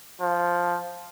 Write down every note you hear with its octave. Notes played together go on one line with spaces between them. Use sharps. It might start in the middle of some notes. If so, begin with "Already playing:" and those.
F3